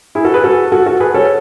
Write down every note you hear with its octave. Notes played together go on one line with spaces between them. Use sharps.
E4 G#4
F#4 A4
G#4 B4
F#4 A4
F#4 A4
F#4 A4
G#4 B4
A4 C#5